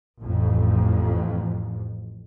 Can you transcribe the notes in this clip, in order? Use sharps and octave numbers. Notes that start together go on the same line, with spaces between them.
A1 F2